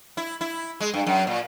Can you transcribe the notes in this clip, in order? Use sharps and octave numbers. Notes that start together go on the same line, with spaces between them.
E4
E4
G#3
G2
F#2
A#2